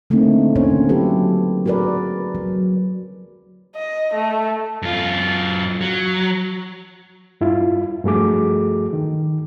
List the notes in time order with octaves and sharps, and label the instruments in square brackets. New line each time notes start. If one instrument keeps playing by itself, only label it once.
[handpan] D3 A3 A#3 C4 D#4
D3 A3 A#3 C#4 C5 C#5
F#3 C#4 E4 G4 A4 B4
F#4 G#4 A#4 B4 D5
F#3
[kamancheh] D#5
A3
[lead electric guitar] F#2 F4
F#3
[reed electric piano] G2 E4 F4
G2 F3 A3 F#4 G#4 D6
D#3